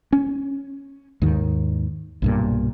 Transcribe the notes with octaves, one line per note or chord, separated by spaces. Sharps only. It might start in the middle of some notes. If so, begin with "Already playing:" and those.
C#4
D#2 G#2 D#3
B1 G2 A#2